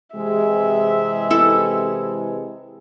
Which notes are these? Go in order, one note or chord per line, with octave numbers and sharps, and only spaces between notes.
C3 E3 G#3 E5
E4 A4